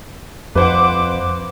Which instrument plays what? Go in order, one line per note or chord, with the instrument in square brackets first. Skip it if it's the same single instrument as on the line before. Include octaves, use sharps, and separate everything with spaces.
[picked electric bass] F2 [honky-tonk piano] B4 C5 F#5 [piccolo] D6